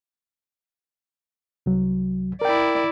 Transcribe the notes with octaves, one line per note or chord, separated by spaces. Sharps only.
C2 F#3
E4 A#4 D5 G5